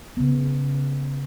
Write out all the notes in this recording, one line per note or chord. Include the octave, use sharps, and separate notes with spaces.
C#3 B3